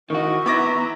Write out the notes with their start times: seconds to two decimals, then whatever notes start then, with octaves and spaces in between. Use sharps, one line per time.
0.10 D#3 E4 F#4 D#5 C#6
0.46 B3 E4 E5 A#5 D6 A#6